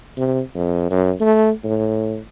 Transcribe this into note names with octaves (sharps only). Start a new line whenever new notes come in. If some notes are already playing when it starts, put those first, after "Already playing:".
C3
F2
F#2
A3
A2